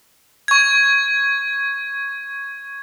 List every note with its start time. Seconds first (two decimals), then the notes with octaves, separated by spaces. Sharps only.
0.48 C#6 G#6